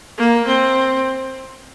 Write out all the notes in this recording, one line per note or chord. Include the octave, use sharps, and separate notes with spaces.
A#3
C4